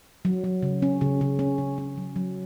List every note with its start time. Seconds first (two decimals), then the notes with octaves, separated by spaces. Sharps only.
0.25 F#3
0.44 F#3
0.63 C#3
0.82 C#4
1.01 C#3
1.21 C#3
1.39 C#4
1.58 C#3
1.78 C#4
1.98 F#3
2.16 F#3